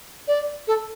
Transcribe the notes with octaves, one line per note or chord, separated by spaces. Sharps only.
D5
A4